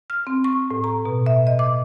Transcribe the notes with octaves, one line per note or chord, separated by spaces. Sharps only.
F6
C4
C#6
A2
A#5
B2
E5
D#5
D6